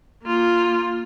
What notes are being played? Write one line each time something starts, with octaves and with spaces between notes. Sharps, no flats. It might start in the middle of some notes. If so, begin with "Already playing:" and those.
A#3 F4